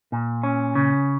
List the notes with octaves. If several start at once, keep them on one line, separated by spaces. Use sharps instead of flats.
A#2
C#4
C#3